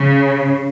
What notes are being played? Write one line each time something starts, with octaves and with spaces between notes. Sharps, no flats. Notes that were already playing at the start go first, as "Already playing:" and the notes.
Already playing: C#3